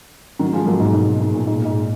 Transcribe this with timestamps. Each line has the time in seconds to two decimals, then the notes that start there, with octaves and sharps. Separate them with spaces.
0.39 D#3 F#3
0.53 F3 G#3
0.66 F#3 A#3
0.80 G#2 B2
0.93 G#2 B2
1.20 G#2
1.34 A#2
1.47 G#2
1.58 A#2
1.65 G#2